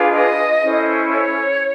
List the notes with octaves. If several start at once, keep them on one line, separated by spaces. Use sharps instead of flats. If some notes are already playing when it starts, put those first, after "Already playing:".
Already playing: D4 F4 G#4 B4
D#5
C#4 E4 A4 C5
C#5